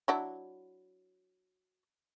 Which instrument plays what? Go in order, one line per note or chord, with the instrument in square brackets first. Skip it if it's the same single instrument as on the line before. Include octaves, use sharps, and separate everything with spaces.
[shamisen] F#3 D4 E4